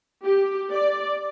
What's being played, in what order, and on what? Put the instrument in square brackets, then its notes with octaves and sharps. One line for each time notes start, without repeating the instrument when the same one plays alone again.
[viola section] G4
D5